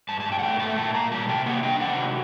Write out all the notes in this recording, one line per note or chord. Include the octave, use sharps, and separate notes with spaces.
G2 A5
A5
G2
G5
F#5
A3 G5
A3 A5
A#2 A5
A#2 A#5
G3 A5
C3 G5
A#3 F#5
D4 G5
C3 F#5
F#3